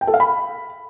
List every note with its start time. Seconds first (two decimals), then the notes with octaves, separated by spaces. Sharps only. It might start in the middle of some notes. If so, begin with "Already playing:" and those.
0.01 G5
0.07 A4
0.14 F5
0.20 B5